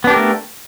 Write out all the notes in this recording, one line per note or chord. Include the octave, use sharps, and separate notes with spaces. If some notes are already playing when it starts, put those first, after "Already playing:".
A3 B3 D4 G4 A#4